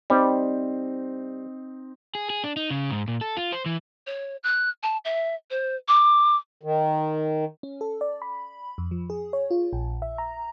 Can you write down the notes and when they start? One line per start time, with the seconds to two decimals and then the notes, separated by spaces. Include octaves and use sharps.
0.10 G3 C4 D#4 C5
2.15 G#4
2.30 G#4
2.44 D4
2.57 D#4
2.71 C#3
2.91 G#2
3.08 A#2
3.21 A4
3.37 F4
3.52 C5
3.66 E3
4.07 C#5
4.43 F#6
4.83 A5
5.05 E5
5.50 C5
5.88 D6
6.63 D#3
7.63 C#4
7.81 A4
8.01 D5
8.22 B5
8.78 F2
8.91 F3
9.10 G#4
9.33 C#5
9.51 F4
9.73 A#1
10.02 E5
10.18 A#5